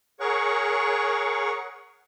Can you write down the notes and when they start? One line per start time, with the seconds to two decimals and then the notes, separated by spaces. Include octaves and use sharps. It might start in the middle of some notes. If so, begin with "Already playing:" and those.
0.20 G#4 A#4 C#5 F#5 C#6